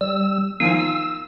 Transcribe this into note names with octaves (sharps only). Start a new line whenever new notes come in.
G3 E6
D#3 F3 F4 F5 G#5 E6
E6